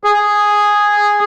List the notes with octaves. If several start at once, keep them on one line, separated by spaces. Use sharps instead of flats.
G#4